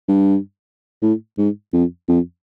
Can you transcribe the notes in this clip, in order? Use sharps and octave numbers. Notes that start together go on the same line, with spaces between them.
G2
A2
G#2
F2
F2